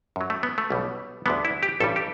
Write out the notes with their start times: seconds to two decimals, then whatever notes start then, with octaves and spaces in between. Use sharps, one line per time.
0.16 F#2 F#3
0.30 A3
0.43 B3
0.58 A3
0.70 B1 B2 G3
1.26 D2 D3 G3 B3
1.45 E4
1.63 G4
1.80 A1 G2 E3 G3 A4
1.96 G4